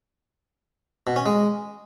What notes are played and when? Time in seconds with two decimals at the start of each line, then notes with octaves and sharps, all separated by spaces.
1.07 B2
1.16 C#4
1.26 G#3